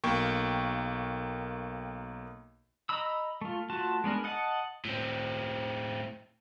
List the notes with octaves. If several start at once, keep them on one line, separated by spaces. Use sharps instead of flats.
B1 A#3 G5 C#6
D#5 A#5 B5 E6
A3 F4
A3 F4 F#4 A5
G#3 B3 D4 A#4
D#5 F#5 A5
A2 C4